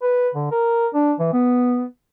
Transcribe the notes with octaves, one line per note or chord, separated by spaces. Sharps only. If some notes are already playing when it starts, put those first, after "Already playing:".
B4
D3
A#4
D4
E3
B3